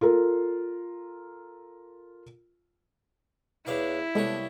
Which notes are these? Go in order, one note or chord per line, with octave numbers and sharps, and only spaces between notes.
F4 A4 A#4
E2 D4 E4 B4 C#5 F5 D6
C2 G#3 A#3 B3 D4 A4 C#5